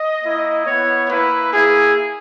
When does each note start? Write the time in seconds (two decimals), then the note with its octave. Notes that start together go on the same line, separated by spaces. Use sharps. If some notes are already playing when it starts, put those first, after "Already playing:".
Already playing: D#5
0.22 A#3 E4
0.65 B3 E4 C#5
1.09 A#3 E4 B4
1.53 A#3 E4 G#4